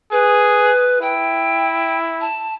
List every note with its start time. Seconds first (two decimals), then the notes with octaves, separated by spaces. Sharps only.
0.12 G#4 B4
1.01 E4 G5
2.21 A5